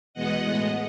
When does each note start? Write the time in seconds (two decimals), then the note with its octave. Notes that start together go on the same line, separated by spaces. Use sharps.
0.14 E2 B2 G#3 B3 D#5 F#5
0.43 A2 G#3 B3